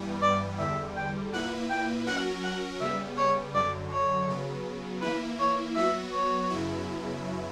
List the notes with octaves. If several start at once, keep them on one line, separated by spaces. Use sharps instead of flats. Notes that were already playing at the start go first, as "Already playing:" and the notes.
Already playing: G2 E3 G3 B3
D5
E2 D3 G3 E5
G5
A#2 A#3 E4 B4 F#5
G5
F#3 C#4 F#4 A#4 F#5
F#5
C#3 G3 B3 E5
C#5
F#2 D3 F#3 D5
C#5
C#3 F#3 B3
E3 A#3 E4 B4
C#5
F#3 B3 F#4 E5
C#5
F#2 C#3 F#3 B3 E4